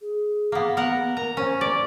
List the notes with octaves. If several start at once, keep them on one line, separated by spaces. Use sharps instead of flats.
G#4
A#3 B3
B3 A#4 F#5
A#4 A#5
C#4 C5
D5